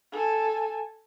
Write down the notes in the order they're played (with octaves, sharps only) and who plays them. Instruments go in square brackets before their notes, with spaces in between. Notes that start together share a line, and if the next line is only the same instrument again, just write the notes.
[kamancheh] A4 G#5